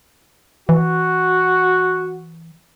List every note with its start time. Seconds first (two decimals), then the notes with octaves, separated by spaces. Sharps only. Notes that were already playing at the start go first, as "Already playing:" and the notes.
0.69 E3 F#4